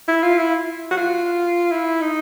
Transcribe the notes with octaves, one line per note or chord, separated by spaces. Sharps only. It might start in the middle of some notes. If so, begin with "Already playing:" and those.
E4
F4
E4
F#4
F4
E4
D#4